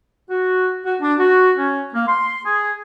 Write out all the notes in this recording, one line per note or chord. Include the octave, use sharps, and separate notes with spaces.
F#4
F#4
D4
F#4
C#4
A#3
C6
G#4